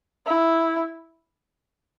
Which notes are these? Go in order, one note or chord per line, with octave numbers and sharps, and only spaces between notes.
E4